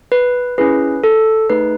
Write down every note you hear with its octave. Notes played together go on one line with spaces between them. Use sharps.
B4
C#4 E4 G#4 B4
A4
A3 D#4 G#4 B4